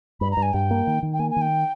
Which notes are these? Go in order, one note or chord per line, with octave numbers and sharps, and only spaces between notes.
G2 B5
A#5
G2
G#5
G2 G5
A#3
D#3
D#3
G5
A#3 G#5
G#5
D#3
G5